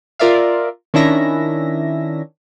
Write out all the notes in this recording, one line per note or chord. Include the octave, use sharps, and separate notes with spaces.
F4 A#4 D5 E5 F5
D#3 C#4 D4 E4 E5 A#6